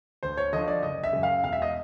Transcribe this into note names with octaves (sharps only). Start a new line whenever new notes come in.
D2 C5
C#5
D3 F3 D#5
D5
F#1 D#5
E5
F#2 C#3
F5
E1 F5
E5
D#5